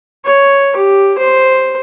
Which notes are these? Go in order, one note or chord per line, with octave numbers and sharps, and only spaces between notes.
C#5
G4
C5